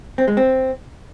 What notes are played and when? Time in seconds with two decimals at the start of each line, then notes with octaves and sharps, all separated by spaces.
0.18 C4
0.28 G#3
0.37 C4